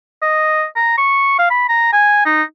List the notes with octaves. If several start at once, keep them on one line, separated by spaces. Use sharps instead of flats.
D#5
A#5
C#6
F5
B5
A#5
G#5
D#4